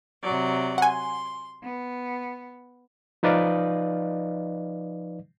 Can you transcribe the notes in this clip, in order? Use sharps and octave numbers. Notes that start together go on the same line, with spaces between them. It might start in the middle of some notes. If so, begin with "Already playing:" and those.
C3 F#3 D5
F#5 G#5 C6
B3
F3 D#4 B4 D5 D#5 F5